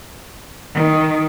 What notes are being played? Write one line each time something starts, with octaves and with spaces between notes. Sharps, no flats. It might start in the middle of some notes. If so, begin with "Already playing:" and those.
D#3